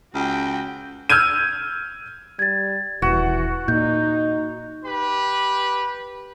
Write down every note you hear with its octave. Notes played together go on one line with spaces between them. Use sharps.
C#2 F#4 G5
E6 F6 G6 G#6 D#7
G3 G#6 A6
D#1 E3 F#4
A#2 D#4 G6
G4 B4